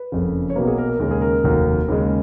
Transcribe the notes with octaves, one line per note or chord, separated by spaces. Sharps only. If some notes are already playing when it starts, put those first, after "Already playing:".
Already playing: B4
F#1 F2 C#3
C#5
B1 B2 F#3 A#3 B4
G#4
A#4
A#4
D#2 C#3 G#3 A#4
G#4
A#4
F1 D#2 D#3 F#3
D#2 C#3 G#3